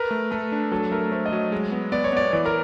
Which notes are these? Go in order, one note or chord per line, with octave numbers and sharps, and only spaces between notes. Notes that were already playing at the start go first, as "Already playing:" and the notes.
Already playing: A#4 B4
A3
A3 A4
D4
F#3 A4
A3 A#4
A3 C5
D#5
F#3
G#3
B3
B3 D5
C#5
B3 D5
E3 D5
A#4